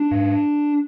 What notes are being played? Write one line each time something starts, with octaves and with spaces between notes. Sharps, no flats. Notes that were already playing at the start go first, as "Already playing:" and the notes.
Already playing: D4
G#2